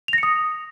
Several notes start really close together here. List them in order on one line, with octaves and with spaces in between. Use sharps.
F7 A#6 C#7 D#6